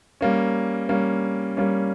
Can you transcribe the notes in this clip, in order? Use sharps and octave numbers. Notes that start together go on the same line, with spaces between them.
G3 A#3 C#4
G3 A#3 C#4
G3 A#3 C#4